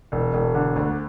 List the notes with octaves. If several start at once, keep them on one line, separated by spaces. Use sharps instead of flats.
E1
E1
D3
D2